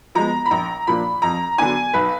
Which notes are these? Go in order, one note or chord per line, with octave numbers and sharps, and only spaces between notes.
F3 G#3 B3 A#5
B5
A#1 A#5
A#2 F3 A#3 D4 B5
F2 A#5
D3 F#3 B3 D4 G#5
B1 B4